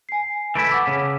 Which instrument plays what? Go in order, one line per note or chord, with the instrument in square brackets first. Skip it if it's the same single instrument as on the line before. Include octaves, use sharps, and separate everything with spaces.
[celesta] G#5 C7
[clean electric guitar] E3 A3 E4 [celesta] D7
[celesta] F#5 C#6 D6
[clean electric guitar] C#3